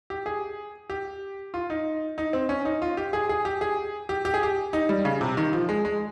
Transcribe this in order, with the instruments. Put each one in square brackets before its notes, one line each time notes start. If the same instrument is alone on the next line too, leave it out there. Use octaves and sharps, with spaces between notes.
[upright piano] G4
G#4
G4
F4
D#4
D#4
C4
C#4
D#4
F4
G4
G#4
G#4
G4
G#4
G4
G4
G#4
G4
D#4
G3
C#3
C3
D#3
F3
G#3
G#3